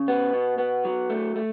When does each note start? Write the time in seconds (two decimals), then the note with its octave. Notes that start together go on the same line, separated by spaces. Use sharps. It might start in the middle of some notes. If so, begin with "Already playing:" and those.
Already playing: C#3
0.08 B3
0.33 B2
0.58 B3
0.85 F#3
1.10 A3
1.36 A3